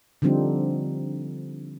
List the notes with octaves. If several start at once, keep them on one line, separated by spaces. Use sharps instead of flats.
D3 F3 G3 C4 D#4